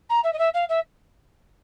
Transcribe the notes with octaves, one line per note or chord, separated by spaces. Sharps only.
A#5
E5
D#5
E5
F5
E5